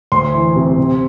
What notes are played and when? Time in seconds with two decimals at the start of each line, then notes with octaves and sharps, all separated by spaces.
0.12 D2 C6
0.34 E3
0.56 C3
0.78 C3